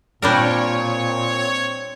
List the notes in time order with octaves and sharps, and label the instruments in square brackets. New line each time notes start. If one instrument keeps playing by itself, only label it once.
[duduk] A#2 [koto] G3 D4 A#4 [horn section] C4 C#5